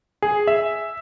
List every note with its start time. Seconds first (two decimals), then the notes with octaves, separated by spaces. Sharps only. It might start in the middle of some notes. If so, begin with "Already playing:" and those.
0.22 G#4
0.47 E5